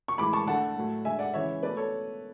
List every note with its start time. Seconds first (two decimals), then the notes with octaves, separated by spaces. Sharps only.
0.08 C#6
0.18 A2 E3 G#3 B5 D6
0.33 A5 C#6
0.47 D3 A3 F#5 A5
0.76 A2 F#3 A3
1.05 D3 G#3 E5 G#5
1.19 D5 F#5
1.34 C#3 E3 G#3 C#5 E5
1.63 B2 A3 B4 D5
1.77 A4 C#5